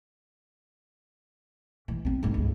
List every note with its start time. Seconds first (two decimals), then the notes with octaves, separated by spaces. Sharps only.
1.88 E3
2.05 B3 C4
2.23 G1 G#2
2.34 C#2